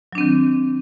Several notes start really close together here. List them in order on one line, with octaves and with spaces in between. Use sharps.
F#3 D4 C4 D#3